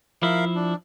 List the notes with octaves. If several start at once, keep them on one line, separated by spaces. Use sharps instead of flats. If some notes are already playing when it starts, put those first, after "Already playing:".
F3 E4 A#4 E5 F5
D4